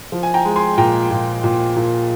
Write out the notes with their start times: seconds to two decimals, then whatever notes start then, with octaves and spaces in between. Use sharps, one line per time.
0.12 F3
0.23 G#5
0.34 G5 A#5
0.45 G#3
0.56 G#5 C6
0.78 A#2 G5 A#5
1.11 A#2
1.44 A#2
1.76 A#2